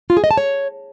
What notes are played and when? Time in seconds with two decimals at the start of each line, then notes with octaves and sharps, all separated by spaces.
0.10 F4
0.17 G#4
0.24 D#5
0.31 A5
0.37 C#5